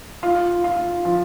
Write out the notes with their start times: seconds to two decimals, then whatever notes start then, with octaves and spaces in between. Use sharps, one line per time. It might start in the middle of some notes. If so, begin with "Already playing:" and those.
0.23 F4
0.64 F4
1.05 F3